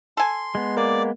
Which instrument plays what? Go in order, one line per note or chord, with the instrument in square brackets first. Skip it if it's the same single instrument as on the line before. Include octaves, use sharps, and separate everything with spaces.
[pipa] A4 G#5 [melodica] C6
[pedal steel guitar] G#3 B3
[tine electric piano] A#3 [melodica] D5